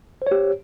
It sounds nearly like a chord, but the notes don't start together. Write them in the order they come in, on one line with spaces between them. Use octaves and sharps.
C5 C#5 G4